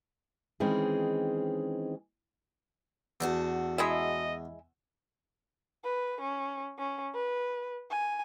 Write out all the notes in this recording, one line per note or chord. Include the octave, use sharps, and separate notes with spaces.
D#3 E3 G#3 C4 C#4 G#4
E2 A3 D4 F#4
G#3 E4 D#5 E5
B4
C#4
C#4
B4
G#5